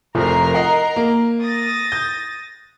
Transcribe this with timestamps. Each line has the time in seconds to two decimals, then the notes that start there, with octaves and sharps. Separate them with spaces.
0.15 F1 F3 A#4 A#5 C7
0.54 D#5 F#5
0.96 A#3
1.42 D#6 A6 A#6
1.92 G6